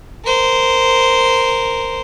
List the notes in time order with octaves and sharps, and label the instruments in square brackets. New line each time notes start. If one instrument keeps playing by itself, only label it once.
[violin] A#4 C5